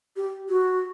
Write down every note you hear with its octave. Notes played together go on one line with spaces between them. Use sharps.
G4
F#4